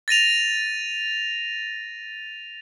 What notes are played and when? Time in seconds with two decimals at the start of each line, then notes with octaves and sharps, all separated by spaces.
0.08 A6 A#6 D#7 F7